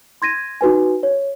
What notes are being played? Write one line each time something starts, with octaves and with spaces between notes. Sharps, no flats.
C6 G#6 A#6 D#7
D#4 F#4 B4 G#5
C#5